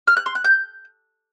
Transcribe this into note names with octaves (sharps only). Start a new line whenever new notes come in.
F6
F#6
C6
F#6
G6